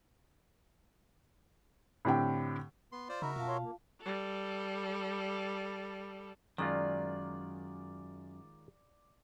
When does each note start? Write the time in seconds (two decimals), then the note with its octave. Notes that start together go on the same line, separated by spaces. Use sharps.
2.05 A2 D3 C4 G4 G5
2.92 B3 C6
3.09 F4 C5 D5
3.22 C#3 D#4 F#4 A#4 E5 B5
3.36 F#2 B2 F4 F5 A5
3.48 C#5 C6
3.62 A#3
4.01 G3 A4
6.58 F#2 D#3 G#3 F4 D5